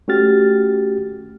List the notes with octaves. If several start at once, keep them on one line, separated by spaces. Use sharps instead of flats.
A3 C#4 F#4 G4 F6 A6